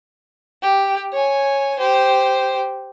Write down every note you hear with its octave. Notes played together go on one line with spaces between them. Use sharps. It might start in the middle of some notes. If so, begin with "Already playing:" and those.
G4
C#5 G#5
G4 C5